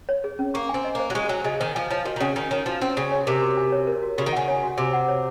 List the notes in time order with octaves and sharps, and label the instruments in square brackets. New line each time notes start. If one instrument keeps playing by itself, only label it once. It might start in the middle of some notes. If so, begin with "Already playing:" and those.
[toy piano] C#5
G#4
C#4
[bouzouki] A#3 [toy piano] C#6
[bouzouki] C4 [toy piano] G#5
[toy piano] D#5
[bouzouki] A#3 [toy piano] C5
[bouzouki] F#3
[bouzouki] G#3 [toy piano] C#6
[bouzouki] F#3 [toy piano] G#5
[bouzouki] C#3 [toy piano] D#5
[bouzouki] D#3 [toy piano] C5
[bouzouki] F3 [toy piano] G#5
[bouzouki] F3 [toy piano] C#5
[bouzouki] D#3 [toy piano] F#4
[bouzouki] D#3
[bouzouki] C#3 [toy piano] C#4
[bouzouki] D#3 [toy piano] G#5
[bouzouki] D#3 [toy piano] C#5
[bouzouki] F3 [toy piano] F#4
[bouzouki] C4 [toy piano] C#4
[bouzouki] C#3 [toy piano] G#5
[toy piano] C#5
[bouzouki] C3 [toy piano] A#4
[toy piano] F#4
G#5
C#5
A#4
F#4
[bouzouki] C#3 [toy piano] F#4
[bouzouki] D#3
[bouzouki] C#3 [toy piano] F#5
[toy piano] C#5
F#4
[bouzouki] C3 [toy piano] F#4
[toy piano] F#5
C#5